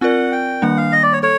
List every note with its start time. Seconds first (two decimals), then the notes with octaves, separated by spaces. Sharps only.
0.01 C4 F4 A#4 D5 F#5
0.32 G5
0.62 D#3 G3 A#3 D4 F#5
0.77 F5
0.92 D#5
1.03 D5
1.13 C#5
1.23 A4 C#5